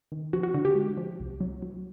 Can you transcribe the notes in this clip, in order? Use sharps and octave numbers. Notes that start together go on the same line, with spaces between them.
D#3
F3 F#4
F#4
D3 F#4
G4
G#3
F3
C2
F#3
F#3